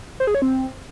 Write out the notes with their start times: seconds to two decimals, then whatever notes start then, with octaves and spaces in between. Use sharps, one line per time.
0.20 C5
0.27 G#4
0.35 C#5
0.42 C4